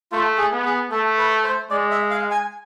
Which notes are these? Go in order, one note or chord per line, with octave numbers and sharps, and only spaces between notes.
A3 F4
G#4
B3
G#4
A3 A4
B4
C5
G#3 D5
E5
F5
G#5